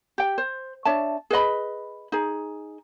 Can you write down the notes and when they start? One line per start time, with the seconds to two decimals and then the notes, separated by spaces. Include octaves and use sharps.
0.18 G4 G5
0.38 C5
0.85 D4 C#5 E5 A5
1.30 G#4 B4 D#5 B5
2.12 D#4 G#4